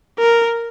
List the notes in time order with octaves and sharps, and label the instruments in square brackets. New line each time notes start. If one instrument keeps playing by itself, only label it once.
[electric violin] A#4